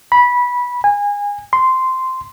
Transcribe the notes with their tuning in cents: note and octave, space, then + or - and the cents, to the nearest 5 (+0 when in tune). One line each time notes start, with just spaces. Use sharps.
B5 -15
G#5 -25
C6 -10